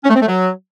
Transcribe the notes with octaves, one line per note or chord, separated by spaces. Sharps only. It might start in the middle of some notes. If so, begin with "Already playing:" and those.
C#4
A3
C4
A3
F#3